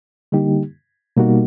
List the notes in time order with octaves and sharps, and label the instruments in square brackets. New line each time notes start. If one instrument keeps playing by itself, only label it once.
[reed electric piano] D3 G3 A#3 D#4 G4
B2 G3 A#3 D#4 F#4